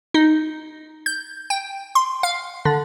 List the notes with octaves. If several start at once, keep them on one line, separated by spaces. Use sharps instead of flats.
D#4
G6
G5
C6
F5
D3